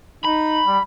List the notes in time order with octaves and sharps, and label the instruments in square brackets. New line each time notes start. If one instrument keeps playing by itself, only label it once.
[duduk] D#4 [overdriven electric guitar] B5
[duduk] G3